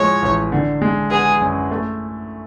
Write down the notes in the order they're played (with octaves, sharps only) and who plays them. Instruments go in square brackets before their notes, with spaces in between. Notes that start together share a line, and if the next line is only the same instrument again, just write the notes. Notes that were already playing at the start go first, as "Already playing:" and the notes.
Already playing: [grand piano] A2 F3 G#3 [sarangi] C#5
[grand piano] A1
D3
G#3
[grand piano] B3 [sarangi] G#4
[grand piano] F#2
A3